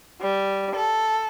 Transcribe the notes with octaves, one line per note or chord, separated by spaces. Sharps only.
G3
A4